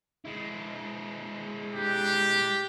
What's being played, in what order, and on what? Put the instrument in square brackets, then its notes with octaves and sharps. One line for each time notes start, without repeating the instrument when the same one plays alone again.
[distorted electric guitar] G#3 E4
[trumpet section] D4 G4